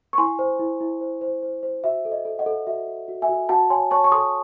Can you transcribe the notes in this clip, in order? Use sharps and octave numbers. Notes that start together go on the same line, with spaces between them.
C#6
E4 G#5 C6
C5
E4
E4
C5
C5
C5
C5
F#4 E5
A4
D#5
A4
D#5 F#5
A4
F#4 E5
F#4
F#4
E5 G#5
F#4
F#4 F#5 A5
C#5 G#5 C6
C#5 A5 C#6
C#6
A4 C6 D#6